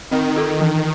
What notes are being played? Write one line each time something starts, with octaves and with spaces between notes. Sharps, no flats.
D#3 C4
F4 A4
E3